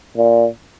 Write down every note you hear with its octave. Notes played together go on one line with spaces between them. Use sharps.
A#2